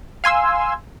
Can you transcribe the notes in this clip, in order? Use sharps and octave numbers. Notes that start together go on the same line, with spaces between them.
F5 G#5 C6 E6